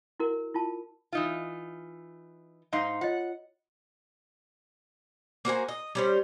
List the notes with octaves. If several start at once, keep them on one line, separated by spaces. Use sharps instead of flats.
E4 F#4 A#4
E4 F4 A5
E3 D#4 F4
G#2 D#4 F5 C6 C7
F4 C#5 D#5 F#5
A#3 F#4 C5 G#5
D#5
G3 C#4 C5